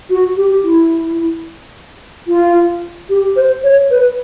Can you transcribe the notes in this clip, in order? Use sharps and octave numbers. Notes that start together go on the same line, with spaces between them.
F#4
G4
E4
F4
G4
C5
C#5
B4